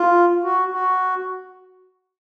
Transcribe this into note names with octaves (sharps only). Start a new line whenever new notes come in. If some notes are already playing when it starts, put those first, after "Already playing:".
Already playing: F4
F#4
F#4